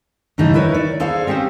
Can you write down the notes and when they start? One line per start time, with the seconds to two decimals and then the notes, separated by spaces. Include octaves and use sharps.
0.38 G2 C#3 E3 A3 D#4
0.54 E4 A#4 B4 C#5
0.74 D5
1.00 G#4 A4 C5 D5 F5
1.27 C4 C#4 G4 G#4 C5